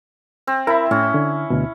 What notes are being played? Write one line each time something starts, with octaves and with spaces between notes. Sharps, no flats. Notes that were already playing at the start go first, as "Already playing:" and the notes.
C4
E4 A#4 B5
A2 C#4
D3
D2 B2